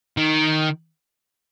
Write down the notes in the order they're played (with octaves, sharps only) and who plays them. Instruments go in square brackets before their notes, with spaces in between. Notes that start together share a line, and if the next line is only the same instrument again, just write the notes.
[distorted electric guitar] D#3